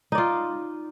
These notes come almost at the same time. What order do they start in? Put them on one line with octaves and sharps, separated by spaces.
D#4 D5 F4